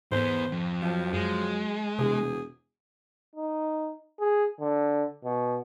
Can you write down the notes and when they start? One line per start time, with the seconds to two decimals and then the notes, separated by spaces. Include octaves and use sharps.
0.12 E2 G#2 B3 C5
0.52 F2
0.82 F3 F#3
1.13 F#2 G#3
1.99 E1 C3 G#4
3.36 D#4
4.20 G#4
4.60 D3
5.24 B2